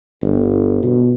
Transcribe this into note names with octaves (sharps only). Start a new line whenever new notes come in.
G1
B2